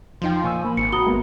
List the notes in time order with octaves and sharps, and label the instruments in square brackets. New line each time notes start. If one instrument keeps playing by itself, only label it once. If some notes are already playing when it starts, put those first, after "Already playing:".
[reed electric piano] E2 D#4 G5 [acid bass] F3 [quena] C6
[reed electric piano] A#2 C#6 E6 [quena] G#5
[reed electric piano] A#3 [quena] B5
[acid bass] G#1 [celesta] C#7
[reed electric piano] F#4 [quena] A#5 [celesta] B5 D#6 G7
[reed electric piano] G#3 A#3 B3